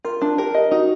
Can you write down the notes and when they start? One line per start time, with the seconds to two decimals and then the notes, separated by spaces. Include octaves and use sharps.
0.05 F4 A#4
0.22 D4
0.38 G4 A#4
0.54 D#5
0.71 D#4 F#4